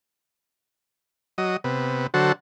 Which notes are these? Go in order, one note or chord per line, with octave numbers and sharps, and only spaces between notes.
F#3 D#5
C3 B3
D3 F#3 F#4 A4 C5